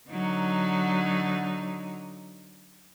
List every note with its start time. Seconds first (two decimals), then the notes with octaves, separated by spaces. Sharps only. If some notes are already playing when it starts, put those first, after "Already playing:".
0.10 D3 F#3 D#4